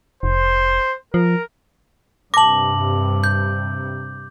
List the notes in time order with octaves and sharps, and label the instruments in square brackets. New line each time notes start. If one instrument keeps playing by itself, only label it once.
[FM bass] F1 [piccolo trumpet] C5
[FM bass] F3 [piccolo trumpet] A#4
[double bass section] G2 C3 [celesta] A5 A#6 [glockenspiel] D6 F#7
[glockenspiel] G6